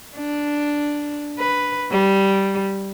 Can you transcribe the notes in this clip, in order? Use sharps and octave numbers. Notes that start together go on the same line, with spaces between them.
D4
B4
G3